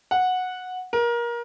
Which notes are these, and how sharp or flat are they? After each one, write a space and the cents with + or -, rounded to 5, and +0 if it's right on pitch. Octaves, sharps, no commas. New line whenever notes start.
F#5 -10
A#4 +25